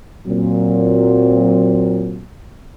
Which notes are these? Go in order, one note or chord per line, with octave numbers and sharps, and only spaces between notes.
A#2 F#3 C4